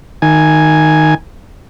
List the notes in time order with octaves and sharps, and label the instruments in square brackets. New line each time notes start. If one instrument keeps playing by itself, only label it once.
[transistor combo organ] D#3 G#5